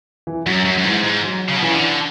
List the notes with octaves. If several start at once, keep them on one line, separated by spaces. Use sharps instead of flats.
E3
F#2 F#3
F#2
F#2
G#2 E3
G#2
F#3
C#3
B2
C#3 E3
D3